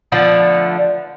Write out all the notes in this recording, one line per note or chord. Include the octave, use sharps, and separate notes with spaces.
D3 F3 A3 B3